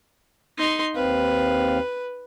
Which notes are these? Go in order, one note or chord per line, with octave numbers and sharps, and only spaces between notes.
D#4 C6
D#2 C4 B4 F5